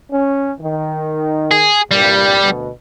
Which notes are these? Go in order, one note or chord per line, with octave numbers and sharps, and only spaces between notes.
C#4
D#3
G#4
C2 G2 A#2 G3
D2 B2